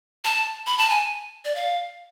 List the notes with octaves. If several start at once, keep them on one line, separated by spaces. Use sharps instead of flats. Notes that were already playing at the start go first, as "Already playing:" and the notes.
A5
B5
A5
G#5
D5
F5